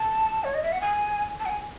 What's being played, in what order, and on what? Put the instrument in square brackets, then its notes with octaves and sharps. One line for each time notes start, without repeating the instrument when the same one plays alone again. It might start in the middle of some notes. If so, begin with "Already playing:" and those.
Already playing: [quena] A5
C#5
D#5
E5
F#5
G#5
A5
F#5
G#5